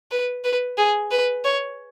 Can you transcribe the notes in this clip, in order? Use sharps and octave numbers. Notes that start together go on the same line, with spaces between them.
B4
B4
G#4
B4
C#5